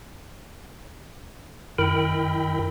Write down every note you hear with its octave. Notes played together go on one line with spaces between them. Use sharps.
F#2 D#3 E4 A#4 G5 B5